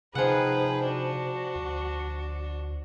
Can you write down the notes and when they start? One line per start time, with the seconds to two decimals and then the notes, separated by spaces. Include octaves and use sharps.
0.15 C3 F3 D#4 G#4 B4 F#5 G5
0.84 D4 F#4
1.55 D2